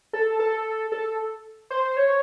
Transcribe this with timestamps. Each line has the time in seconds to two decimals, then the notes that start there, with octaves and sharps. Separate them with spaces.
0.13 A4
0.39 A4
0.92 A4
1.71 C5
1.97 C#5